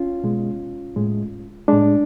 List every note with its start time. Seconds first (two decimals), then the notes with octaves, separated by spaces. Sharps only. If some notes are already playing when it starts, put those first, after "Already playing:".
Already playing: C#4 F4
0.24 B2 G#3
0.96 A2 G#3
1.68 A2 G#3 D4